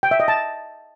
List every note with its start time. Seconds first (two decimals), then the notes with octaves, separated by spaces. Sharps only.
0.03 G5
0.11 E5
0.20 D#5
0.28 A5